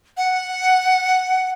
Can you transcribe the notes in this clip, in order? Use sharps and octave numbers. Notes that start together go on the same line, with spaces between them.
F#5